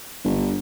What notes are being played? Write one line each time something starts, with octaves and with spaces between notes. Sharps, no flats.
G1